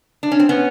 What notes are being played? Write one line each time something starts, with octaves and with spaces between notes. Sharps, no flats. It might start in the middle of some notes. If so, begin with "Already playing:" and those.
D4
C#4
C4
B3 C#4